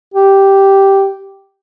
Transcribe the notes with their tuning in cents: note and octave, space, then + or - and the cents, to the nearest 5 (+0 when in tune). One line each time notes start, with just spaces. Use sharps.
G4 -5